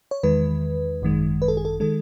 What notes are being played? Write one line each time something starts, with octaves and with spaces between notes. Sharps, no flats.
C#5
E2 D#3 G#3 B4
G#1 F#2 D#3 G#3
B4
A4
G#4
A4
D#3 G#3 A4